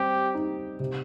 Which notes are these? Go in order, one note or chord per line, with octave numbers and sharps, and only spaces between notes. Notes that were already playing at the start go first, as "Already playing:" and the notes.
Already playing: G3 C4 G4
D#4
C3